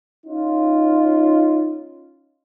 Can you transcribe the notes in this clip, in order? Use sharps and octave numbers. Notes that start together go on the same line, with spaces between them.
C#4 D#4 F4